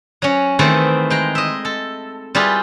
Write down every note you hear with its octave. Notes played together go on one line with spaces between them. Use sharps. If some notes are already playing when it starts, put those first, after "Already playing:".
F#3 C#4
D#3 E3 A3 C4 G#4 B4
G#3 G5 A#5
D#5 E5
A4
G3 E4 F4 G4 G#4 B4